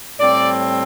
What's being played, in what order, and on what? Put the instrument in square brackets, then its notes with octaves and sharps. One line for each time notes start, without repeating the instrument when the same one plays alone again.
[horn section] A2 G3 C4 D5